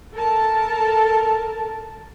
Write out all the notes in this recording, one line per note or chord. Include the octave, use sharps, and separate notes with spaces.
A4 A#4 A5